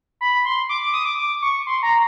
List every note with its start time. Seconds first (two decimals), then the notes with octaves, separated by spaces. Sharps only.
0.21 B5
0.45 C6
0.69 D6
0.82 D6
0.94 D#6
1.05 D6
1.18 D6
1.42 C#6
1.67 C6
1.83 A#5